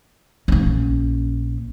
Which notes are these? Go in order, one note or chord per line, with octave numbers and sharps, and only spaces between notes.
A#1 C#4